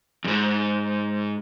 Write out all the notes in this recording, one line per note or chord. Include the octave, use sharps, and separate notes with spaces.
E2 G#2